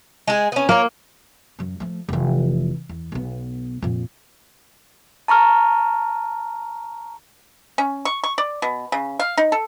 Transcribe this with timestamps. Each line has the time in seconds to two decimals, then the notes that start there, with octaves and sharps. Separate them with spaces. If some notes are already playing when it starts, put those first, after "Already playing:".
0.28 G#3 G#4
0.52 B3 C#4
0.69 A#3 A#4 C#5
1.59 F#2 F#3
1.80 F3 A3
2.09 F1 E3
2.89 E2
3.12 B1 B3
3.82 F2 A#2
5.28 A5 A#5 C#6 F6
7.78 C#4
8.05 C#6
8.24 C#6
8.38 D5
8.62 B2
8.92 C#3
9.19 F5
9.37 D#4
9.52 A4